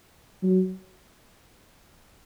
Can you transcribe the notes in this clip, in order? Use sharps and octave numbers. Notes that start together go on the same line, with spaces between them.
F#3